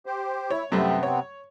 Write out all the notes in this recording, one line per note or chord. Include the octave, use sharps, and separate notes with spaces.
G4 C5
E4 C#5
F#2 C3 G3 A3 B3 C4
C#5